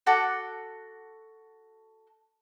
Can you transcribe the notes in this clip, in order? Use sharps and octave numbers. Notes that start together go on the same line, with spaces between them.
F#4 A4 F#5 D6